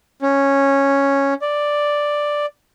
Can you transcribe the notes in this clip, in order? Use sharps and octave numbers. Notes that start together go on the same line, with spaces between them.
C#4
D5